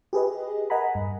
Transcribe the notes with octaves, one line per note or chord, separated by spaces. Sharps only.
G4 G#4 B4 D#5
A#4 D#5 F#5 G#5 A#5 B5
G2